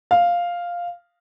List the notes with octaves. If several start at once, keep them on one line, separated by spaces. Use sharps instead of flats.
F5